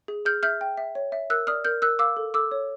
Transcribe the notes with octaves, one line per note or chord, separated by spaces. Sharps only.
G#4
G#4 F6 G6
E5 F6 G6
G5
E5
C#5
E5
A#4 E6 F#6
D5 D#6 F6
A#4 F6 G6
A#4 E6 F#6
F5 D6 E6
A4
A4 D6 E6
C#5